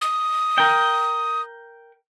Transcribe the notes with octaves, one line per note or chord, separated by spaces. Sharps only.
D#6
A#4 G5